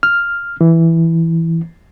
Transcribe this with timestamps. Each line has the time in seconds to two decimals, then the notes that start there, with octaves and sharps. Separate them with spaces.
0.03 F6
0.61 E3